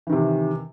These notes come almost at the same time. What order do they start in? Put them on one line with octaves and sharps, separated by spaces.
E3 D#3 C3